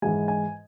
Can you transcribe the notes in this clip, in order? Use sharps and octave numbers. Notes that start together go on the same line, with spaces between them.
G#2 E3 G#3 G#5
G#5